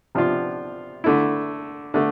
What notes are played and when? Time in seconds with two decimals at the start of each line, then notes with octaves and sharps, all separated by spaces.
0.15 C3 F3 B3 D4 F4
1.04 D3 A3 E4
1.94 D3 A3